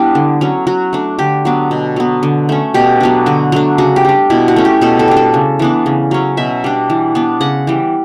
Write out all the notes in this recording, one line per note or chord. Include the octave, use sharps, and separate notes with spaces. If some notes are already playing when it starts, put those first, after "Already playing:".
Already playing: G3 B3 D4 E4
D3
F#3 C#4
F#3 F#4
A3 D4
D3 G4
F#3 B3 D4
B2
F#3 B3
D3
A3 C#4
B2 G4
F#3 B3 D4
D3 F#4
F#3 A3 D4
C#3 F#4
G4
G3 D4
B2 E4
F#4
A3 C#4
G4
B2 A4
A4
G3 D4
A4
C#3
E3 B3 D4
C#3
F#3 C#4
B2 E5
G3 D4
E3
B3 D4
C#3 F#5
E3 G3